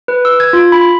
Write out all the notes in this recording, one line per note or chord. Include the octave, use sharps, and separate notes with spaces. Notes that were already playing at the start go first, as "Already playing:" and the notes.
B4
E6
G#6
F4
B5